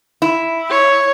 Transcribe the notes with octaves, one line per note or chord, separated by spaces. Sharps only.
E4
C#5